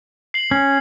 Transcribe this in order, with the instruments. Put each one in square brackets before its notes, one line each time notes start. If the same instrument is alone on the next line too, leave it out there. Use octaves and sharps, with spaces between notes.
[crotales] C7 F#7
[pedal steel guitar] C#4